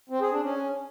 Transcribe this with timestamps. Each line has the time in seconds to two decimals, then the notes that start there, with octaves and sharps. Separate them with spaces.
0.10 C4
0.21 G#4
0.32 D4
0.43 C#4